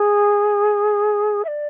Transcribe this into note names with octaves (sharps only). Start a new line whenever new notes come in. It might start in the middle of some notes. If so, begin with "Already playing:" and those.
Already playing: G#4
E5
D5